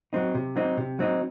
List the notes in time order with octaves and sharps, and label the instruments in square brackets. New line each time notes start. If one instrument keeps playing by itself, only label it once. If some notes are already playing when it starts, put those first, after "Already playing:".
[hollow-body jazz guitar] F#3 C4 D#4
C3
F#3 C4 D#4
C3
F#3 C4 D#4